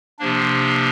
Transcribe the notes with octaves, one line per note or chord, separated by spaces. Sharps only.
C3 F3 A#3 D4